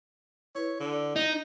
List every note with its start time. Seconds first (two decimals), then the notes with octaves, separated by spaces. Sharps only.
0.55 E4 B4 C#5
0.80 D3
1.16 D#4 D#5